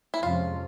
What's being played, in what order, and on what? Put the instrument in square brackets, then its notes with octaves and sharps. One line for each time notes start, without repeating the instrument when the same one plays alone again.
[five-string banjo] E4
[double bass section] F2 C3 F3 G#3 C#4 [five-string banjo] F4